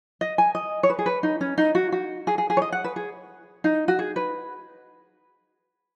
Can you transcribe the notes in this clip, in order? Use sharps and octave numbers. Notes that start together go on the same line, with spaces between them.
D#5
G#5
D#5
C#5
B4
G#4
B4
D#4
C#4
D#4
F#4
F#4
G#4
G#4
G#4
C#5
D#5
F#5
B4
G#4
D#4
F#4
G#4
B4